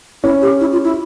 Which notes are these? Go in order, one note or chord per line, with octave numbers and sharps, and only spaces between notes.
C#4 E4
G4
E4
F4
E4